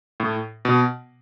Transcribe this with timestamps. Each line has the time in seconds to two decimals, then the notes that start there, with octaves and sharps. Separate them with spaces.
0.20 A2
0.65 B2